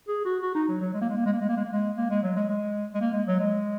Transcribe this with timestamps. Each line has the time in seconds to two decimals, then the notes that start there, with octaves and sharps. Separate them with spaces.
0.08 G#4
0.25 F#4
0.42 F#4
0.55 D#4
0.68 F#3
0.81 F#3
0.94 G#3
1.01 A#3
1.10 G#3
1.17 A#3
1.26 G#3
1.33 A#3
1.41 G#3
1.49 A#3
1.56 G#3
1.65 A#3
1.73 G#3
1.97 A#3
2.11 G#3
2.23 F#3
2.36 G#3
2.49 G#3
2.94 G#3
3.01 A#3
3.13 G#3
3.27 F#3
3.40 G#3